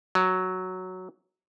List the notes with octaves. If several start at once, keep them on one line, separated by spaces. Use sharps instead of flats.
F#3